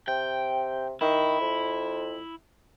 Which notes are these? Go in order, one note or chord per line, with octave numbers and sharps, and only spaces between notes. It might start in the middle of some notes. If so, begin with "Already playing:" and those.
C3 G5
D#3 E4
F2